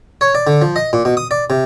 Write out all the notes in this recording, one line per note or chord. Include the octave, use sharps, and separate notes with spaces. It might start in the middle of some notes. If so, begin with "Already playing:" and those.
C#5
D5
D3
F3
D#5
A#2
B2
D#6
D5
C3